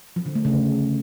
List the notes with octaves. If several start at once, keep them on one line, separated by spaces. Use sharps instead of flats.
F3
D3
A3
C#3